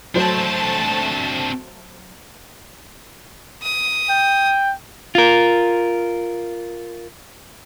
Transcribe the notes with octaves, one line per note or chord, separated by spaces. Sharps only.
F#3 A3 C4 D4 C5 A5
D#6
G5
F4 A#4